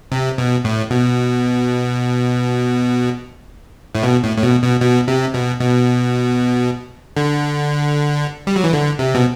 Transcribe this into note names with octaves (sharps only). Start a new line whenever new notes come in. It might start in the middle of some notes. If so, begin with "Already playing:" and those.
C3
B2
A2
B2
A2
B2
A2
A2
B2
B2
B2
C3
B2
B2
D3
G3
F#3
E3
D3
C3
B2